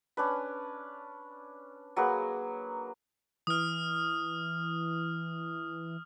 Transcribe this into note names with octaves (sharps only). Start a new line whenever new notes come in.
C#4 D4 B4
F#3 A#3 G#4 B4
E3 D#6 F6